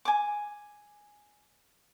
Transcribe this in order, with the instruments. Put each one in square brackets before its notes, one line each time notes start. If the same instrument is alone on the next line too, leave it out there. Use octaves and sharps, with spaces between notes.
[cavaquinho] G#5 D6